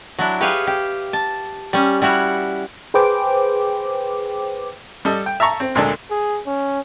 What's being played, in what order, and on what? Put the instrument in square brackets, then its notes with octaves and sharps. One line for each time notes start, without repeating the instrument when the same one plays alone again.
[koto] F#3 D4 E4
G4 G#4 B4 C#5 E5 F5
G4
A5
G3 C#4
G3 E4 F#4 C#5
[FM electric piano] G#4 B4 C5 G5 D6
[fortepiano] G3 A4 D#5
G5
E5 A5 A#5 C#6
C4
D2 A#2 G#3 D4 A4
[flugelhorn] G#4
C#4